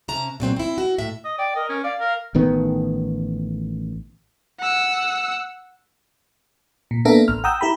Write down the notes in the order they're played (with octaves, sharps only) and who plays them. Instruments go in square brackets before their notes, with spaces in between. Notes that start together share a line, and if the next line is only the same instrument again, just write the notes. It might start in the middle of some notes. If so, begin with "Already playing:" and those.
[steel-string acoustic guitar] C3 C#4 A5 A#5
A#2 F#3 C4 F#4
C4 E4
F#4
A2 E5
[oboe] D#5
[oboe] D5 [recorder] G5
[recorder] A#4 [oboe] D#5
[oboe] C#4
[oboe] D5 [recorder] F5
[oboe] A#4
[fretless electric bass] A1 D#3 B3
[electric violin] F#5 E6
[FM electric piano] A#2
A#3 B3 D4 A4 A#4 E5
A1 F6
F#5 G5 A#5 D#6 E6 G6
E4 G4 A#5 B5